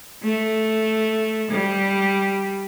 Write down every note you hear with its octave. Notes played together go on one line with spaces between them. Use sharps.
A3
G3